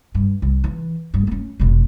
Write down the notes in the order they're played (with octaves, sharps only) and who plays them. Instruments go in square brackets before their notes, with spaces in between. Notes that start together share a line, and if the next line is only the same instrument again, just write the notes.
[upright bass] G2
C2
E3
G2
A#3 C#4
F1 B2